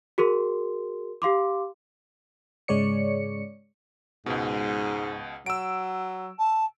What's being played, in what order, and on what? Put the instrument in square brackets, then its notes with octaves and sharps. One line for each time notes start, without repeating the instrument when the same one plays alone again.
[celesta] F#4 G#4 A#4 C6
G4 F5 C6 D6
[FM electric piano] G#2 C#3 G#3 C#5 D5 C#7
[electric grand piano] C#2 B2 [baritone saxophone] G#2
[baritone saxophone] F#3 [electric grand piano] E6 D7
[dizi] A5